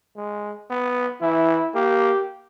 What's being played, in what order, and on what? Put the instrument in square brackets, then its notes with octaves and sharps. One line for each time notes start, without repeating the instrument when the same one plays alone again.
[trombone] G#3
B3
[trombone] E3 [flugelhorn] E4
[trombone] A#3 [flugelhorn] G4